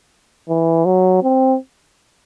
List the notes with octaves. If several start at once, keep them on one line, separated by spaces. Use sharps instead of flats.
E3
F#3
C4